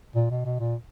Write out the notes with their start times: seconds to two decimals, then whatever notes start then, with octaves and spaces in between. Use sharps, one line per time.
0.15 A#2
0.30 B2
0.45 B2
0.60 A#2